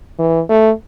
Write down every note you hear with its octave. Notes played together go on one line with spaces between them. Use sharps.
E3
A3